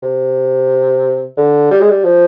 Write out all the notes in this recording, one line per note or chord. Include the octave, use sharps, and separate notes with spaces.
C3
D3
G3
G#3
G3
F3